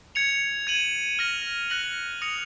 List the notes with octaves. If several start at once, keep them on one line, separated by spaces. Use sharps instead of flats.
G#6 C#7 F7
G#6 D#7 F#7
F6 A#6 F7
F#6 A#6 C#7 F#7
D#6 A#6 C#7 F7